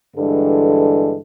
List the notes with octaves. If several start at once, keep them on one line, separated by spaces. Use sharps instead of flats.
G2 D3 E3 G#3 D4 A4